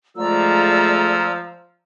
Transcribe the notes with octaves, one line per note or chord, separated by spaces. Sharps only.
F3 G#3 A3 F4 D5 A#5 E6